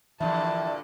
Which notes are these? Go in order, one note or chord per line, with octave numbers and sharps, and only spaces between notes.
G2 A#2 D3 E3 F3 E4 A5